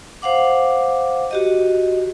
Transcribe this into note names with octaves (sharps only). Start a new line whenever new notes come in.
C5 F5 F#5 D6
F#4 G4 D#5